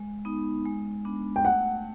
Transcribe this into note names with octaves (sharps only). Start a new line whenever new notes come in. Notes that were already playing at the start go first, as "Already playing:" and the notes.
Already playing: G#3
B3 D#4
G#3
B3 D4
G5
A3 F#5